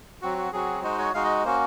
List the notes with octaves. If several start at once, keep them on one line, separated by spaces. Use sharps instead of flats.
F#3 C4 F#4
F#4
F#3 C4 F#4 G#4
G#3 D#4 F#4 C5
C#5
G#3 D#4 F#4 F5
D#5
A#3 C#4 F#4 C5